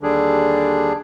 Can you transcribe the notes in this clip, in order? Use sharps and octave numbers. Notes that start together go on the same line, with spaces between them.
D#2 D3 G3 D4 G#4